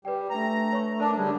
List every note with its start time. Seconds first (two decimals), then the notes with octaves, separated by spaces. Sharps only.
0.05 G3 B4 D5 G5
0.30 A3 D4 B4 A#5
0.73 C#5 C#6
1.00 D4 A#4 A5
1.18 D3 G3 G#4